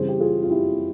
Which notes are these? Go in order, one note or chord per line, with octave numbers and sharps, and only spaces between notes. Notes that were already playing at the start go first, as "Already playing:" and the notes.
Already playing: C#3 E3 G3 C4 G#4 C5
G4
F4 G#4
F4
E4 G4